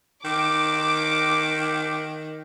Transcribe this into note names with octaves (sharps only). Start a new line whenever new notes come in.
D#3 D6